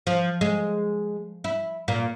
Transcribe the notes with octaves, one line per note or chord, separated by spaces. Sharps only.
F3
G#3
E4
A#2 A#3